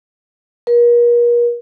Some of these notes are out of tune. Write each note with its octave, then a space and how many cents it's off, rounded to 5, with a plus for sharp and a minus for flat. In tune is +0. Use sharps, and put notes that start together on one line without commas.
A#4 +40